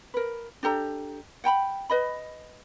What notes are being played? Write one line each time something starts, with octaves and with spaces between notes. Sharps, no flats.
A#4 B4
D4 G4 A4 A#5
F#5 G5 A#5 B5
B4 D#5 B5